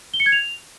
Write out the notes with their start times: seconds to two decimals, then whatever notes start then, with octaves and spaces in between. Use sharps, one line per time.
0.14 G7
0.20 C#7
0.26 G#6
0.32 F7